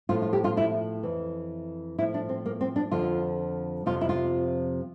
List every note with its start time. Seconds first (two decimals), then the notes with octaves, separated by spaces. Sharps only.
0.09 A2 F3 F4
0.22 F4
0.33 G4
0.44 F4
0.57 E4
1.03 F2 E3
1.98 A2 F3 E4
2.14 D4
2.29 C4
2.46 A#3
2.61 C4
2.76 D4
2.92 F2 D3 F3 F4
3.86 F2 C3 F3 F4
4.01 E4
4.09 F4